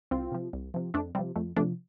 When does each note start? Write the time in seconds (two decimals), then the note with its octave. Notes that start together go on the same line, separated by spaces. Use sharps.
0.11 C2 C4 F4
0.32 C3 F3
0.53 C2
0.74 C3 F3
0.94 F2 A3 D4
1.15 C3 G3 C4
1.19 F3
1.36 F2 A3
1.56 F3 A3 D4
1.60 C3